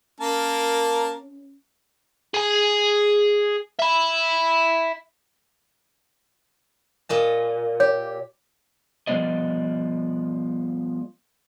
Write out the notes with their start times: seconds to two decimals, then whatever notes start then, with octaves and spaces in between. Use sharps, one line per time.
0.21 A#3 C#4 A#4 A5
2.34 G#4 G#5
3.79 E5 B5
7.09 A#2 D#5 A5
7.80 G4 C#5
9.07 F3 G3 B3 D5 D#5